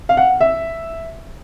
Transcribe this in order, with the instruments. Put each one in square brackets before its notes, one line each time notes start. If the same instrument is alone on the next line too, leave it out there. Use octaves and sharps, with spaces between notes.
[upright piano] F5
F#5
E5